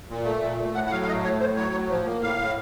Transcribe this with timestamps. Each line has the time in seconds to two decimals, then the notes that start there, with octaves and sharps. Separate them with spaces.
0.10 A#2
0.25 A3
0.42 A#2
0.58 A3
0.75 A2 F#5
0.87 F#5
0.91 F#3 F5
1.02 F5
1.07 A3 D#5
1.24 A2 C#5
1.40 A2 C5
1.57 F#3 C#5
1.73 A2
1.89 F3
2.06 A#3
2.22 A2 F5
2.38 A2